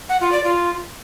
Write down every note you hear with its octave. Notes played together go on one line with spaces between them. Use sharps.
F#5
F4
D5
F4